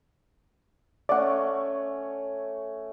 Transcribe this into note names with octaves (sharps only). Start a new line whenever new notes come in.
A3 C#4 D5 F#5